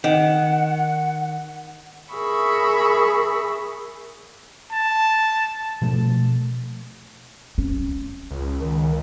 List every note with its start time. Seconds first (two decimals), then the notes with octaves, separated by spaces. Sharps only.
0.04 D#3 F#5
2.12 G#4 A#4 E5 B5 C#6
4.71 A5
5.82 B2 F3 A3
7.58 C#4
8.30 C#2
8.61 D#3